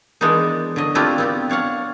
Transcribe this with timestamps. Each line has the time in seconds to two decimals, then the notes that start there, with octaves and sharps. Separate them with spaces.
0.21 D#3 E3 G#3 B3 D4 D#4
0.76 D3 F#3 D#5
0.95 A3 C4 D4 E4 F4 G4
1.18 B3 C4 G4
1.50 D4 C#5 F5 F#5